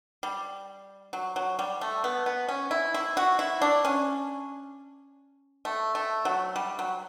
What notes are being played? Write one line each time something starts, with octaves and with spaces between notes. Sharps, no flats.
G3
F#3
F#3
G3
A3
B3
B3
C#4
E4
E4
F#4
E4
D4
C#4
A3
A3
F#3
G3
F#3